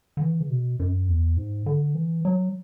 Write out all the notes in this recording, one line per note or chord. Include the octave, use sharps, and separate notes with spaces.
D3
E3
C#3
B2
F#2
E2
G#2
D3
E3
F#3